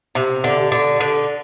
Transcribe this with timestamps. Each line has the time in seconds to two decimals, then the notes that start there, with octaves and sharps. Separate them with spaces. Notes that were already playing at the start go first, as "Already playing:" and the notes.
0.15 C3
0.44 D3
0.72 D3
1.00 D3